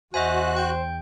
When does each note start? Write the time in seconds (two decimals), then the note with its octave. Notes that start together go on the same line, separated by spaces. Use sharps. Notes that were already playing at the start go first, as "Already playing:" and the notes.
0.14 E2 F#4 C5 D#5 E5 G#5 F#6
0.56 G5 G6